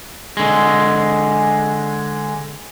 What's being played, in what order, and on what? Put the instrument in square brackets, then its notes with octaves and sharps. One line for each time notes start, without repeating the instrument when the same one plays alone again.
[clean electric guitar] D3 G#3